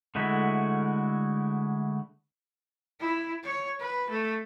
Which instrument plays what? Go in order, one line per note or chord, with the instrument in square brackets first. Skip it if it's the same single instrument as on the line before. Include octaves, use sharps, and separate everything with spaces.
[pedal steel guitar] D3 G#3 A3 E4 F#4
[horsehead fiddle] E4
C#5
B4
A3